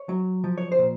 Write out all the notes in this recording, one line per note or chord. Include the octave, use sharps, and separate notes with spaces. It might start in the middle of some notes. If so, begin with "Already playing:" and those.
Already playing: C#5
F#3
F3
C#5
C5
A#2